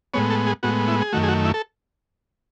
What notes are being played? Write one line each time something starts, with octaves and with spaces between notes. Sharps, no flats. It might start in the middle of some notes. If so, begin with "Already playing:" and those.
A2 G#3 B3 C#5
A4
G#4
A2 G#3 B3 F#4
E4
G#4
F#2 D#3 A3 F#4
G#4
F#4
E4
A4